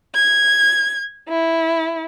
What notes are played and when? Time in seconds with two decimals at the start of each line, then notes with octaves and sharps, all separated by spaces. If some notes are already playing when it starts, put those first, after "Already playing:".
0.14 G#6
1.29 E4